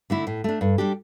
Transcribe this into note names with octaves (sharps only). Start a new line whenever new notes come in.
D3 A3 E4
A2
A3 D4
G2
G3 D4 G4